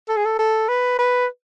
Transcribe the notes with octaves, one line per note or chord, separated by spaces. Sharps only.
A4
G#4
A4
A4
B4
B4